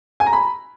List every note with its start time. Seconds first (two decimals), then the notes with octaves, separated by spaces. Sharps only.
0.20 G#5
0.26 A#5
0.33 B5